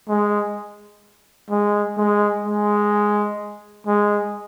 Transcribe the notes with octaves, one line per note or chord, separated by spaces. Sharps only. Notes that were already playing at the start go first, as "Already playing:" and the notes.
G#3
G#3
G#3
G#3
G#3